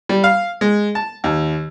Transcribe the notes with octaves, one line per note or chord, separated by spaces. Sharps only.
G3
F5
G#3
A5
D#2